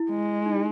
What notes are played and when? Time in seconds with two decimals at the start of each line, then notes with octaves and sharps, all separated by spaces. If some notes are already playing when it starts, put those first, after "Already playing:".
Already playing: E4
0.10 G#3
0.46 D#4